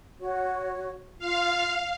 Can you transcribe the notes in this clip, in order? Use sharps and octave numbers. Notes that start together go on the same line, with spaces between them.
F#4 C#5
F4 F5